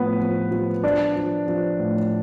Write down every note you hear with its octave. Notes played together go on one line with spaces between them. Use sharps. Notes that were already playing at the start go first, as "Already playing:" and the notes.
Already playing: A2 F3 B3 B4
F3
F3
F3 D4 D5
F3
F3
A2